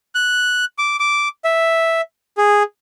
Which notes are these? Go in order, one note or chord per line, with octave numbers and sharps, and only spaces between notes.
F#6
D6
D6
E5
G#4